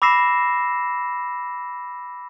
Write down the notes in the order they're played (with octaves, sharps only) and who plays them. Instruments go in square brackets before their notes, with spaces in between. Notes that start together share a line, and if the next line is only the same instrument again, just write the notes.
[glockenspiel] B5 D6 E6 A#6 C7 E7